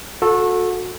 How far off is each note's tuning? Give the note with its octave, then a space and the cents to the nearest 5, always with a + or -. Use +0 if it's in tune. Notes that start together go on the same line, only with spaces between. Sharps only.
F#4 -30 A4 +0